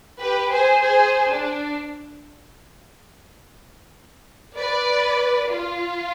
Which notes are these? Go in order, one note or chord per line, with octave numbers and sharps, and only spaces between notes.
G4 B4
G#4 C5
G#4 C5
D4
B4 D5
F4